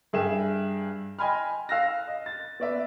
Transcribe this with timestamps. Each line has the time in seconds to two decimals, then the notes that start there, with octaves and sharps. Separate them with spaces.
0.13 G2 G#4 E5 G5 E7
1.19 D#5 G5 G#5 B5 C6 F6
1.69 F5 E6 F#6 A#6
2.07 D#5
2.26 A6
2.60 B3 D5 E5